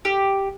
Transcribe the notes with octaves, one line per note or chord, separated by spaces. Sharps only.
G4